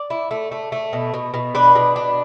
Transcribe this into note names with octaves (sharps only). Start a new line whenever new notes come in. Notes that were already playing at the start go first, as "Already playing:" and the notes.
Already playing: D5
E4
A3
A3
A3
B2
B2
B2
D4 B4
B2
D4